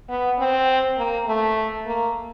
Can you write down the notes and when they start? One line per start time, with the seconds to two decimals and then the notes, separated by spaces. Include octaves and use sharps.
0.09 B3
0.39 C4
0.97 A#3
1.27 A3
1.86 A#3